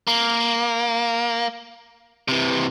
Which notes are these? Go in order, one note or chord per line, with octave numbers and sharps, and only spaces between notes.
A#3
C3 E3